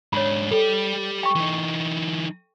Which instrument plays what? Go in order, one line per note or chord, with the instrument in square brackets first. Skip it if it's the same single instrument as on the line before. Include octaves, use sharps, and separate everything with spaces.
[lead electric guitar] G#2 D4 [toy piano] C#5 B5
[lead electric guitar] G3 G4 [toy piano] A4
[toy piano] G5 C#6
[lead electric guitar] E3 D#4